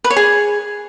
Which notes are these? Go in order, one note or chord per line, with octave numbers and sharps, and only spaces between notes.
B4
C#5
G#4